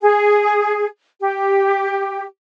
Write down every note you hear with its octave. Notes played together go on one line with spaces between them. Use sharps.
G#4
G4